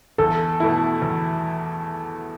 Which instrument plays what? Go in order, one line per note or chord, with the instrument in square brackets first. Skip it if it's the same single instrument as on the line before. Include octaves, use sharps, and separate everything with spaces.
[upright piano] E2 [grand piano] A4
[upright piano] B2 A3 E4
E2